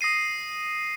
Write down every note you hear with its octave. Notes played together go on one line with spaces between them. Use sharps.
D#6 A#6 C7 D#7